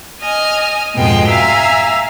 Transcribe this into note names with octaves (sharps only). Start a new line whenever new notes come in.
D#5 G#5 F6
F2 G#2 B2 G#3 G5
E5 F5 G#5 A#5 E6